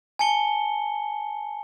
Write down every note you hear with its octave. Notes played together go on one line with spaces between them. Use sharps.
G#5 A5 C#7 G7